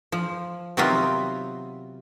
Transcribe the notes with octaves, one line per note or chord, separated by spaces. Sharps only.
F3
C3 D#3 F#3 B3 C4 F4